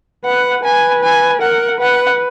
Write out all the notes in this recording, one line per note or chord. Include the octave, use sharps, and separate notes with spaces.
B4 F#5
B4 G#5
G#5
A#4 F#5
B4 F#5